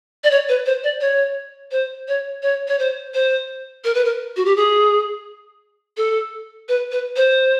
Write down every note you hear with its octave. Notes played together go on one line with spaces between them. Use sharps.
D5
C#5
B4
C5
D5
C#5
C5
C#5
C#5
C#5
C5
C5
A#4
B4
A#4
F#4
G4
G#4
A4
B4
B4
C5